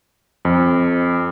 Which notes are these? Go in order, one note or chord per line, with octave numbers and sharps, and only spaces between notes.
F2